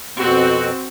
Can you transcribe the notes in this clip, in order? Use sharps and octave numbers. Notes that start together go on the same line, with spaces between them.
F2 B2 C4 F#4